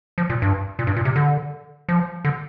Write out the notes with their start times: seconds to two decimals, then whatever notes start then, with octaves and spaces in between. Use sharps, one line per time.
0.18 F3
0.30 A#2
0.42 G2
0.79 A#2
0.87 G2
0.97 A#2
1.05 C3
1.16 D3
1.89 F3
2.25 D3